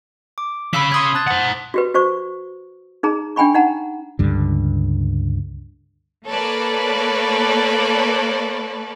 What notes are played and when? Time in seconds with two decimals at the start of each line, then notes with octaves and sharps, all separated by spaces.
0.38 D6
0.73 C#4 F5 B5 E6 B6
0.92 C6 D#6 G#6
1.14 A5 F#6 A6
1.27 C5 F#5
1.74 F#4 G4 B4
1.94 F#4 C5 C#6
3.03 D#4 G#4 A#5
3.36 D4 G5 G#5 B5 C#6
3.54 D#4 F#5 A#5
4.19 C#2 G2 D3
6.28 A#3 A4 B4 C#5 D5